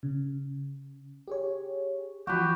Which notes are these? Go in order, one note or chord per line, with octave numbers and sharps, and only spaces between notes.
C#3
G4 G#4 C#5
E3 F3 F#4 G4 B4